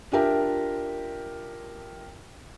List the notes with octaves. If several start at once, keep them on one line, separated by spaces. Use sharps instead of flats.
D4 F4 G4 A#4 E5